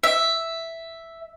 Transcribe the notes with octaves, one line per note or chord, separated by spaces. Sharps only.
E5